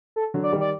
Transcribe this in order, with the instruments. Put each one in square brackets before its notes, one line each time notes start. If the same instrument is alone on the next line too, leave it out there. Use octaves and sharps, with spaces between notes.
[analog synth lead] A4
[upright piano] D3 F#3
[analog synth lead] D5
[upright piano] D#3 G3
[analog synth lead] D5